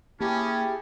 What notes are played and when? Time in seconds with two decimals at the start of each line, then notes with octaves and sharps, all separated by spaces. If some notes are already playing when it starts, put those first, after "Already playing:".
0.20 A#3 C#4 E4 G4 G#4 A5